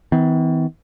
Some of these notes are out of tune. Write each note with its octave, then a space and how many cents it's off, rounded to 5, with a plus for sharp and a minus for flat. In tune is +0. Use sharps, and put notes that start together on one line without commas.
E3 -40 B3 +45